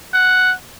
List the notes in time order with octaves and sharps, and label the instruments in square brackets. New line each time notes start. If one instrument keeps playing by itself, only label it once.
[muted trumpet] F#5